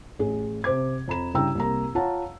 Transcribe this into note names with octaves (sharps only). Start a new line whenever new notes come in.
A1 G#4
C3 C5 D6 G#6
F2 A#5 B5 E7
G2 C#3 E4 G5 A#5 E6
C2 A#3 A#5
F4 C#5 F5 F#5 A5 A#5